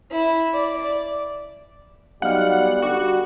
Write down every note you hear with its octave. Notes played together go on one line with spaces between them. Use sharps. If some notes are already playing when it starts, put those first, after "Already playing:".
E4
D5
B1 G3 D#5 F5 F#5 F6
D3 G3 F#4 F#5 D6